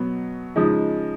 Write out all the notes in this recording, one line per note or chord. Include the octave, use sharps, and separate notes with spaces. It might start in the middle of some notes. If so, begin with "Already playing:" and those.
Already playing: B2 F#3 B3
C#3 F3 G#3 D#4